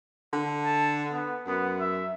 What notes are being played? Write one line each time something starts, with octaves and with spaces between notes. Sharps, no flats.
D3
A5
B3
F#2 B3
E5